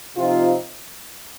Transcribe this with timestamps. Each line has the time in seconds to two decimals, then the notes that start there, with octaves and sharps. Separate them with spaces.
0.16 C3 F3 C4 D#4 F4